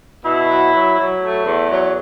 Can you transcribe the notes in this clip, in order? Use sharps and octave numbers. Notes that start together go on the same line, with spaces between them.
B2 E4
F#3
F#3
F#3
A3
E2
F#3